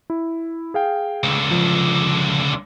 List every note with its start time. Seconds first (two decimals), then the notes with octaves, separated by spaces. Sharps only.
0.10 E4
0.74 G#4 F5 G5
1.23 C#2 D3
1.51 F3